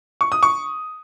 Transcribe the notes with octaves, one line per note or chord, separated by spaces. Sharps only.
C#6
D#6
C#6